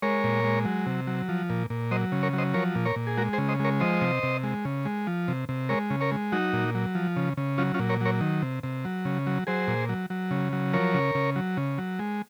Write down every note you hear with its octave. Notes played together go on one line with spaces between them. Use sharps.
G#3 A#4 C#5
A#2
G#3
F#3
C3
F#3
F3
A#2
A#2
F#3 C5 D#5
C#3
A#4 C#5
F#3
C5 D#5
F3 A#4 C#5
A#2
A#4 C#5
A#2
G#4
G#3 F#4 A#4
G#4 C5
C#3
C5 D#5
G#3 A#4 C#5
F3 C5 D#5
C3
C3
G#3
C#3
G#3
F3
C3
C3
G#3 A#4 C#5
C#3
A#4 C#5
G#3
F#3 D#4 F#4
A#2
F#3
F3
C#3
C#3
F#3 C#4 F4
C#4 F4
A#2
A#4 C#5
F#3 A#4 C#5
D#3
C3
C3
F#3
C#3
F#3
F#3 G#4 C5
A#2
F#3
F#3
C#3
F#3
F3 A#4 C#5
C#3
C#3
F#3
C#3
F#3
G#3